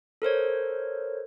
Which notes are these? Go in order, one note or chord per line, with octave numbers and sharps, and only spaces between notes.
A4 A#4 C5 C#5